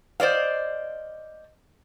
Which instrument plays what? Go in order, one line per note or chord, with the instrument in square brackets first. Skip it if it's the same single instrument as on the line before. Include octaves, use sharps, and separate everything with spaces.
[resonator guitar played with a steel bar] C5 D5 D#5 F5